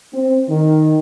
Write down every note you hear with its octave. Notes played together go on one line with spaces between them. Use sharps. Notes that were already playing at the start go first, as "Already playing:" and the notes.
C4
D#3